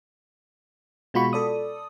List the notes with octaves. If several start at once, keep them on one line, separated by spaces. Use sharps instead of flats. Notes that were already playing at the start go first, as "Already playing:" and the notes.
B2 G#3 F4 F#4 B5 C#6
A4 D5 D#6